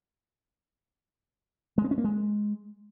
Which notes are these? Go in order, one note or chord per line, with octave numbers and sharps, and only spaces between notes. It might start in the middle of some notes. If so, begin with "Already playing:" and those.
G#3
C4
C#4
A#3
G#3